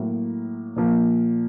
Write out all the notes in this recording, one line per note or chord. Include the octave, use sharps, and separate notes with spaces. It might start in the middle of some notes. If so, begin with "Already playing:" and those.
Already playing: A2 F#3 A#3
A#2 F3 A#3